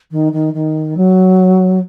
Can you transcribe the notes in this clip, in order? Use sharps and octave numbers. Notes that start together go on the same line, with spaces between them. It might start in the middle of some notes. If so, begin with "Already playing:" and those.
D#3
D#3
D#3
F#3